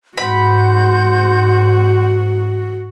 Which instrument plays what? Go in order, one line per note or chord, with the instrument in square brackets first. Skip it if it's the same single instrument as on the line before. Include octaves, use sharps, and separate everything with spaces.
[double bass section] G#2 [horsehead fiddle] F#4 [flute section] F#5 C6 G6 [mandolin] B5